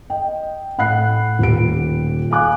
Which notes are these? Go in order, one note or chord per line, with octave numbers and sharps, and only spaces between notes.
D#5 G5
A2 F#5 B5 F#6 C7
D#1 G4 D7
F5 G#5 D6 F#6